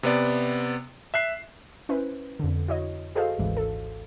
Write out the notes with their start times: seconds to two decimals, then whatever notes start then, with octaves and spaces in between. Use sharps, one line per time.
0.03 C3 B3 D5
1.14 E5 F#6 C7
1.89 C#4 E4 B4 C5
2.40 F2 D3
2.68 E4 F#4 C#5 D#5
3.15 F#4 G#4 A4 C5 D#5 F5
3.38 G#1 D2 G#2 E3
3.57 A4